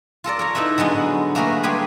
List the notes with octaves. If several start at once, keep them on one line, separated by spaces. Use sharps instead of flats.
F4 A4 A#4 D5
A#4 C#5 A#5
D#4 E4 A4 B4 E5
D3 F#3 G#3 B3 F#4
A3 A#3 F#4 G#4 A#4 B4
G3 G4 G#4 B4 G#5 C6